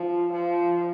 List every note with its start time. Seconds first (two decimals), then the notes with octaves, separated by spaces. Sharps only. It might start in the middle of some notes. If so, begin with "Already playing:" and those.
Already playing: F3
0.32 F3